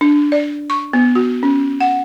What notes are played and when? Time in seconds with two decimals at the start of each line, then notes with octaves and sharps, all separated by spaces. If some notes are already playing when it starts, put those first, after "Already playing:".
0.01 D4
0.32 D5
0.70 C#6
0.93 B3
1.15 F#4
1.43 C#4
1.81 F#5